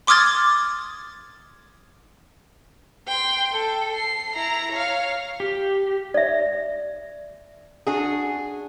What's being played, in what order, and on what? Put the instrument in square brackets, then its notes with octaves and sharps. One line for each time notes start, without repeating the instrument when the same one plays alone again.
[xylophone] C6 D6 D#6 F6 G#6 A6
[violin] G5 C6
A4
C7
E4 A#5
C#5 F5
[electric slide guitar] G4
[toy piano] D5 E5
[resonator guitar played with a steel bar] D4 F#4 G#4